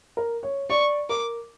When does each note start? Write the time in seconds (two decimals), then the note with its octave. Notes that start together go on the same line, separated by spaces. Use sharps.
0.17 A#4
0.43 C#5
0.70 D5 C#6
1.09 A#4 D6